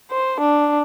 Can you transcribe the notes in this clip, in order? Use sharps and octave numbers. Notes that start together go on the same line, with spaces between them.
C5
D4